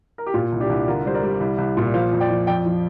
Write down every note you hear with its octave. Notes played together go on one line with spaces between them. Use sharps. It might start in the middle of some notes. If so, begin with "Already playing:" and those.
A#4
G4
A#2 F4
C2
D4 G4
C2
D3 F4 A#4
G3 C5
A#4 D5
G3
C2
C2
A#2
F3 C5 F5
F2
D5 G5
F3
F2 D5 G5
F3